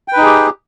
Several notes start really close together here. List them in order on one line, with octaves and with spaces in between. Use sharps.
G5 B4 D#4 G#4 G4